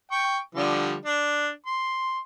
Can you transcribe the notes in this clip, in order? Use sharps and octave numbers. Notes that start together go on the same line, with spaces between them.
G5 C#6
D3 F3 G3
D4
C6